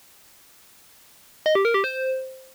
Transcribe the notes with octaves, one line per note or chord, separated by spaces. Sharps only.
D#5
G4
A#4
G4
C5